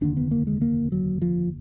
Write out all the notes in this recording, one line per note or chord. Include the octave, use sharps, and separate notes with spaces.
F1 D#2 D3 D4
B3
A#3
G#3
A#3
F#3
F3